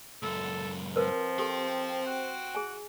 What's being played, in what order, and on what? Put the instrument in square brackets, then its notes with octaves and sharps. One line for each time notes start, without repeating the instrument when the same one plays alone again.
[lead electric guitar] C#2 F#2 [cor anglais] A4
[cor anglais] F3 [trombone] C4 [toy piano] A#4 B4
[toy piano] G4 A4 [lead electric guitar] G5 C6
[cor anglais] F#4
[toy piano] G#4 G#5